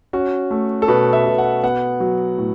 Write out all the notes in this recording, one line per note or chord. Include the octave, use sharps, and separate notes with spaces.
C#4 F#4
A3
A4
B2 B4
E5
B2
F#5
B3 F#5
F#3
A2